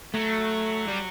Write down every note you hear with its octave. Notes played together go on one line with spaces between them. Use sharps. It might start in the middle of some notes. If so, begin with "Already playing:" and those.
F#3 A3
G3